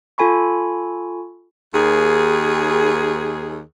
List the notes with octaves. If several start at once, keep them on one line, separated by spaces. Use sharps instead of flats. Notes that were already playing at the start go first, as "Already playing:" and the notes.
F4 A4 G#5 B5 C#6
D#2 G#4